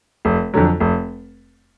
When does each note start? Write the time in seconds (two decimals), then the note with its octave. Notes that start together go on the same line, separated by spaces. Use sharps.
0.25 F1
0.54 F2 D3 F#3
0.80 F1